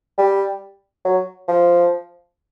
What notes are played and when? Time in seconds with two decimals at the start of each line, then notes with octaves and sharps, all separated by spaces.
0.18 G3
1.05 F#3
1.48 F3